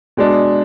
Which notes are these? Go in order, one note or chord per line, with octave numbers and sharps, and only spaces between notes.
B2 G#3 D4